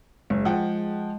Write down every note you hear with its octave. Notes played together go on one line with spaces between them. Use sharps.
F#1 G#3
F3 F#5 G5